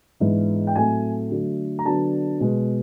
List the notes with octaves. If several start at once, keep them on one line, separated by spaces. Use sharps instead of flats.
G#2 E3 G#3 B3 D4
G5
A2 F#3 A3 C4 G#5
D3 F#3 A3
A#5
D3 F#3 B3 D4 A5
B2 G#3 B3